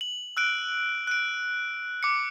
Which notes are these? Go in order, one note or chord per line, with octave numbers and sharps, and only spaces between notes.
F#7
E6 F#6 D7
F#6 D7
D6 C#7